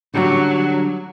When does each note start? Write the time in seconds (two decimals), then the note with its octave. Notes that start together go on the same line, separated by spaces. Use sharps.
0.14 D3 F#3 G3 F#4